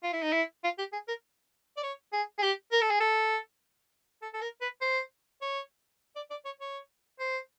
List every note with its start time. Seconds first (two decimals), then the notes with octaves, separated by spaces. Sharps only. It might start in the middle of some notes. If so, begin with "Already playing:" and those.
0.03 F4
0.13 E4
0.22 D#4
0.32 E4
0.64 F4
0.78 G4
0.93 G#4
1.08 A#4
1.77 D5
1.83 C#5
2.13 G#4
2.38 G#4
2.43 G4
2.72 A#4
2.81 A4
2.90 G#4
3.00 A4
4.22 A4
4.34 A4
4.42 A#4
4.61 B4
4.81 C5
5.42 C#5
6.16 D5
6.30 D5
6.45 C#5
6.60 C#5
7.19 C5